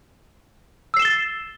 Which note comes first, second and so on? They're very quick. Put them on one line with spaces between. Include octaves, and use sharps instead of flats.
E6 C7 E7 G7 A6